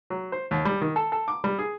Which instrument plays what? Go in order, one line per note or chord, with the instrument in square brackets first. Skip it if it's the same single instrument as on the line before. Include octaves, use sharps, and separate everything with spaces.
[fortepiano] F#3
C5
D#2
G3
D#3
A4
A4
D6
G3
G#4